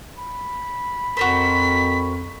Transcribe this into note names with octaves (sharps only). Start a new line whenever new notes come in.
B5
F2 F#4 A#4 C5 B6